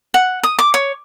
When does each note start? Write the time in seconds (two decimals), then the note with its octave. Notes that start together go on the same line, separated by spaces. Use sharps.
0.14 F#5
0.43 D#6
0.59 D6
0.74 C#5